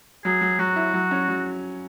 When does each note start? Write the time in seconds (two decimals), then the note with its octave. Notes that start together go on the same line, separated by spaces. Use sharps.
0.25 F#3 G#4
0.41 F#3
0.59 F#3 F#4
0.76 E4
0.94 F#3
1.11 C#4
1.29 F#3